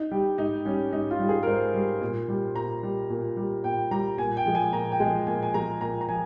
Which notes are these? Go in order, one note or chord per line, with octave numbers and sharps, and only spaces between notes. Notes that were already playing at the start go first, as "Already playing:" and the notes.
Already playing: D#4
G3 G4
G#2 D#4
G3 C#4
G#2 D#4
F4
G3
G#4
A#4
G#2 C5
G3
A#2
G3
A#2 A#5
G3
A#2
G3
A#2 G5
G3 A#5
A#2 G#5
G5
F3 G#3
G#5
A#2 A#5
G5
F3 G#3 G#5
A#2 G#5
G#5
F3 G#3 A#5
A#2 A#5
A#5
F3 G#5